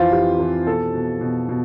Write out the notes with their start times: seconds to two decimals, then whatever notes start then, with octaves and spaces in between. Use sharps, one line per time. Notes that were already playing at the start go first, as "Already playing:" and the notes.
Already playing: F2 E3 F4 C5
0.12 E3 G4
0.40 E3
0.66 B2 A4
0.94 B2
1.21 B2
1.49 B2